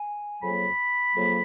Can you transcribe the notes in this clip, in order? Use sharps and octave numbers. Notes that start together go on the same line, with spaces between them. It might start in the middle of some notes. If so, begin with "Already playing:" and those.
Already playing: G#5
F2 C#3 F#3 A#3 B5
F2 C#3 F#3 A#3